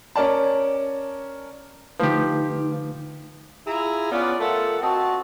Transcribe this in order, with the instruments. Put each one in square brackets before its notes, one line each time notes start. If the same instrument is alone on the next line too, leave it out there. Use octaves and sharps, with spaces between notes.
[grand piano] C#4 A#4 D5 A5
[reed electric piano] D3 A3 B4 [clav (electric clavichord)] F3 G4 [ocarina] D#4
[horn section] E4 F4 G#4 A#5
B3 C#4 F4 D5
A3 F4 A4 A#4 F#5
C4 F#4 D#5 A5